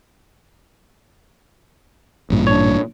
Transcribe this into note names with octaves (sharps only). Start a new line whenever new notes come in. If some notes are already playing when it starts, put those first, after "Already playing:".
A1 G2 A#2
D4 C#5